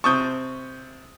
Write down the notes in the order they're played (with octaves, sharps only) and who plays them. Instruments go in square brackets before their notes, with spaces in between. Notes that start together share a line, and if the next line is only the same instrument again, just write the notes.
[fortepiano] C3 C4 A5 [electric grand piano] C#6 D#6 G6